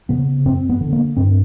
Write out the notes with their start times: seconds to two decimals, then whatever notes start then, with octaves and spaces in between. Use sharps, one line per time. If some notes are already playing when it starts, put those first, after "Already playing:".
0.09 C#3 B3
0.45 F#2 C4
0.69 B3
0.81 D3
0.93 A#3
1.16 G2 C4